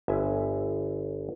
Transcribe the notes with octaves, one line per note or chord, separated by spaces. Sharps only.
G1 E5 G#5